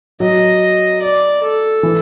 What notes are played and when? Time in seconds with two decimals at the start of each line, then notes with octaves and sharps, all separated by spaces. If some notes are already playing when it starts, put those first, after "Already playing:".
0.20 F#3 D#5
1.02 D5
1.43 A4
1.83 E3